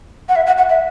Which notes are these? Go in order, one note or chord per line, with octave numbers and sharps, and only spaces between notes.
F#5
E5
F#5
F#5
E5